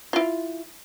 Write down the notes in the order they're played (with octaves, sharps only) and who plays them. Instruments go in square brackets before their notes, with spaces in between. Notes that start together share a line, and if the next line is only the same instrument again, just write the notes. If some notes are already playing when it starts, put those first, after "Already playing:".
[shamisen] E4 F4